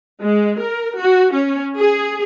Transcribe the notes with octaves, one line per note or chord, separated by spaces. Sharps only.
G#3
A#4
F#4
C#4
G#4